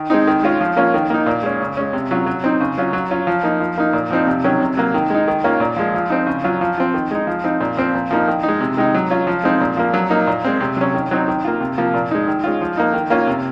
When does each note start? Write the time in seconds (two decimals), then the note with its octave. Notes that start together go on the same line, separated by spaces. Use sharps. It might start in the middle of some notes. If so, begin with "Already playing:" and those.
Already playing: D#3
0.10 G#3 C4 D#4
0.27 D#3
0.43 G#3 C#4 F4
0.61 F3
0.77 A#3 C#4 F4
0.94 D#3
1.10 A#3 D#4
1.26 A#2
1.43 G#3 C#4
1.60 C#3
1.77 G#3 C#4
1.93 C3
2.11 F#3 C#4 F4
2.26 F#3
2.44 C4 D#4
2.60 C#3
2.78 F#3 C#4 F4
2.93 F#3
3.11 C#4 F4
3.27 F3
3.43 A#3 D#4
3.60 F3
3.78 A#3 D#4
3.93 A#2
4.10 F3 C4 D#4
4.27 C3
4.44 D#3 F#3 C#4
4.60 C3
4.77 F#3 A#3
4.94 D#3
5.10 G#3 D#4
5.28 D#3
5.44 A#3 C#4 F4
5.60 A#2
5.77 F3 G#3
5.94 F3
6.10 C4 D#4
6.27 C#3
6.44 F#3 C#4 F4
6.61 F3
6.78 C4 F4
6.94 D#3
7.11 G#3 D#4
7.27 F3
7.44 C4 D#4
7.60 A#2
7.77 F3 C4
7.94 A#2
8.11 F3 A#3 D#4
8.28 D#3
8.43 D#4
8.48 G#3
8.60 C3
8.77 D#3 G#3 D#4
8.94 F#3
9.10 C#4 F4
9.27 F3
9.44 G#3 C4 D#4
9.60 A#2
9.77 F3 A#3
9.94 F#3
10.10 A#3 D#4
10.27 A#2
10.44 G#3 C4
10.60 C3
10.77 F#3 C#4
10.94 D#3
11.11 F#3 C4 D#4
11.28 D#3
11.45 A#3 F4
11.61 C3
11.78 F3 A#3 F4
11.94 A#2
12.11 G#3 D#4
12.28 D#3
12.44 G#3 C#4 F4
12.61 F3
12.77 A#3 D#4
12.93 D#3
13.10 A#3 C#4 F4
13.27 C3